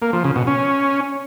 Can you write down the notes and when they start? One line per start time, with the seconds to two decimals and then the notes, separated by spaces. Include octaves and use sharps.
0.02 A#3
0.13 F3
0.24 C#3
0.36 B2
0.47 C#4